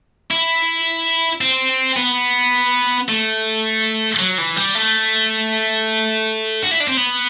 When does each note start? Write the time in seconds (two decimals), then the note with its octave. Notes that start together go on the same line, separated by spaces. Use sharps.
0.31 E4
1.41 C4
1.97 B3
3.08 A3
4.19 F#3
4.38 E3
4.56 G3
4.75 A3
6.63 F#4
6.71 E4
6.80 D4
6.88 C4
6.97 B3